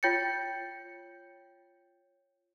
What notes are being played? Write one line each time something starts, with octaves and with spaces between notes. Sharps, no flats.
F4 C#5 G5 G6 A6 C#7